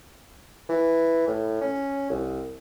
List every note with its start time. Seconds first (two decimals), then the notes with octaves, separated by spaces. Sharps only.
0.69 E3
1.28 A2
1.61 C#4
2.10 C2